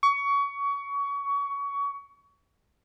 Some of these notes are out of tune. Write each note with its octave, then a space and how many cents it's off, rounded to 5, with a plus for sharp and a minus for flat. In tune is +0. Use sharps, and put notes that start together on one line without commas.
C#6 +25